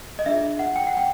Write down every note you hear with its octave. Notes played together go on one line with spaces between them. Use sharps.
D#5
D4 F4 G#4 E5
F#5
G5
F#5
G5